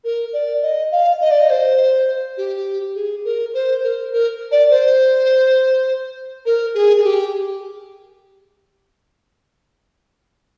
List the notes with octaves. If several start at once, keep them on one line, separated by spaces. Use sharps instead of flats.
A#4
D5
D#5
F5
D#5
D5
D#5
C5
G4
G#4
A#4
C5
A#4
A#4
D5
C5
A#4
G#4
G#4
G4